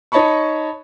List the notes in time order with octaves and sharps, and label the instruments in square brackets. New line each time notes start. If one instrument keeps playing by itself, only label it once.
[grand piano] D#4 C#5 D#5 A5 B5 C#6